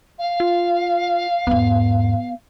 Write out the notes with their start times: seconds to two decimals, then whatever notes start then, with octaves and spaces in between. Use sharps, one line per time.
0.19 F5
0.40 F4
1.47 E2 G#2 B3